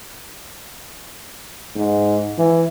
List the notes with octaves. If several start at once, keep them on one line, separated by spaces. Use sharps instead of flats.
G#2
E3